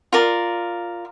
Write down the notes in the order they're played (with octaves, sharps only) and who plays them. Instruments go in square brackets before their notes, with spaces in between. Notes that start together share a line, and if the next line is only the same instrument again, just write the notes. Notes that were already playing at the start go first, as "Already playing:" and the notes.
[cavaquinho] F4 A#4 D5